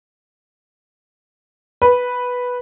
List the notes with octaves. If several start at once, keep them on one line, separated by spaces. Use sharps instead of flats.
B4